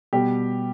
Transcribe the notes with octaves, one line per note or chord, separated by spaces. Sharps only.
B2 G3 G4